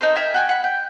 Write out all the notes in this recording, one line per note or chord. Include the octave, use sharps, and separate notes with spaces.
D#4 A4 A#4 C5
A#4 E5 G5 G#5
F#4 G5 G#5
F#5 B5
G5